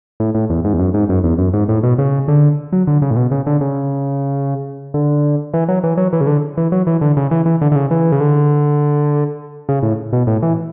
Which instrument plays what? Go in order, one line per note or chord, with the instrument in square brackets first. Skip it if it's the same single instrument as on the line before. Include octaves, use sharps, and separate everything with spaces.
[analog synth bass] A2
A2
E2
G#2
E2
F#2
G#2
F#2
E2
F#2
G#2
A2
B2
C#3
D3
F#3
D3
C#3
A2
B2
C#3
D3
C#3
D3
E3
F#3
E3
F#3
E3
C#3
D3
E3
F#3
E3
D3
C#3
E3
E3
D3
D3
C#3
E3
C#3
D3
C#3
A2
B2
A2
E3